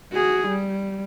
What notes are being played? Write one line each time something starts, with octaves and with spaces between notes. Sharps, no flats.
F#4 G#4
G3